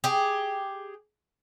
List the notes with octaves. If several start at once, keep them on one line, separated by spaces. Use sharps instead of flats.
G4 G#4